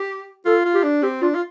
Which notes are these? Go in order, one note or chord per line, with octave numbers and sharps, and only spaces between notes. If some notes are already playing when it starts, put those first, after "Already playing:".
Already playing: G4
F4 A4
F4
G4
D4
C4 G4
D4 F4
F4